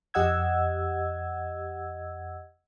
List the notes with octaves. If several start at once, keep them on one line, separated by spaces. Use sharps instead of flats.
F2 G4 D#5 F#5 E6 G#6